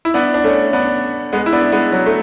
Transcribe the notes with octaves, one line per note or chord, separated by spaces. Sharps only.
E4
B3 D4
D4
A3 C#4
B3 D4
G#3 B3
E4
B3 D4
G#3 B3
F#3
A3